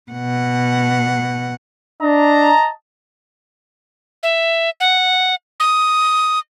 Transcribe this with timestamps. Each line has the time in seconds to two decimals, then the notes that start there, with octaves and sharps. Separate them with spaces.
0.12 B2 F#5
2.02 D4 D#5 A5 A#5
4.23 E5
4.80 F#5
5.60 D#6